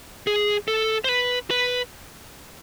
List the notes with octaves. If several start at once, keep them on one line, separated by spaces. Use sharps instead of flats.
G#4
A4
C5
B4
B4